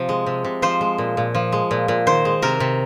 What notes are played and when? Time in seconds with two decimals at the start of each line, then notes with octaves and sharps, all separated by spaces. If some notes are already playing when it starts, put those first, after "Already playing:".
Already playing: C3 F3
0.09 G#3
0.26 C3
0.44 C3
0.62 F3 C5
0.81 G#3
0.98 A#2
1.17 A#2
1.35 F3
1.52 G#3
1.71 A#2
1.88 A#2
2.07 D#3 C5
2.25 G#3
2.42 C3 A#4
2.60 C3